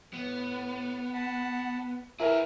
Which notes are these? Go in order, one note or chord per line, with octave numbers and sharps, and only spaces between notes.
A2 B3
F#5 A5 B5
A#2 E4 G#4 A#4 B4 F6